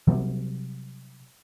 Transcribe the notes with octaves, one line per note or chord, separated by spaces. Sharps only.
C3 F#3 G3